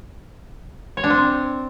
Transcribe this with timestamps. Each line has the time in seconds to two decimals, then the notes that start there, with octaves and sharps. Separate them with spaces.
0.97 C#5
1.04 D4
1.10 C4